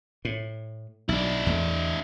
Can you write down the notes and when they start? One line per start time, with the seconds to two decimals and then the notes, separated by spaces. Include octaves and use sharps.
0.25 A2
1.09 B1 D4 E4
1.47 E2 A3